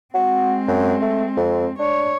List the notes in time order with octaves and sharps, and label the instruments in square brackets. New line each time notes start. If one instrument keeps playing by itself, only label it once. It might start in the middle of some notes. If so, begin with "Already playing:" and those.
[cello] G#3 C4 [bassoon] F#4
[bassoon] F#2
A3
F2
[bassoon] D4 [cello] C#5